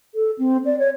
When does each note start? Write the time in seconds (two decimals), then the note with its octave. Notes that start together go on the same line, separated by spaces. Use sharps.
0.15 A4
0.38 C4
0.65 D5
0.79 C#5